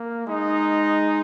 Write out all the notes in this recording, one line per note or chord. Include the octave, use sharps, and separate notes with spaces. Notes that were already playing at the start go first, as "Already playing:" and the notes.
Already playing: A#3
G#3 D#4